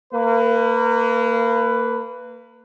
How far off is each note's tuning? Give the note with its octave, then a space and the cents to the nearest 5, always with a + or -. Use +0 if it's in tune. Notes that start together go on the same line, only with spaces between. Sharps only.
A#3 -25 B4 +10